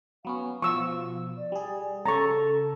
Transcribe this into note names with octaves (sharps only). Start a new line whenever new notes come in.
F#3 B3 C#4 F5
B2 F3 C#6 E6
D5
G3 G#4
C#3 A4 A5 A#5 C#6